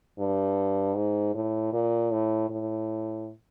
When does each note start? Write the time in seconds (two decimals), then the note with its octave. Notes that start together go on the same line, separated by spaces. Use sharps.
0.19 G2
0.96 G#2
1.34 A2
1.73 A#2
2.11 A2
2.50 A2